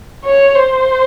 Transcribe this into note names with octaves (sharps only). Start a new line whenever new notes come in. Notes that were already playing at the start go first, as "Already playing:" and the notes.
C#5
C5